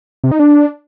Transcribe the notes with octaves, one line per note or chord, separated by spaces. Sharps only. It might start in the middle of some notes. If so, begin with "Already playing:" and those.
C3
D#4
D4